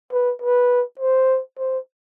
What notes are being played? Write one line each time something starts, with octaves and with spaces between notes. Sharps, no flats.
B4
B4
C5
C5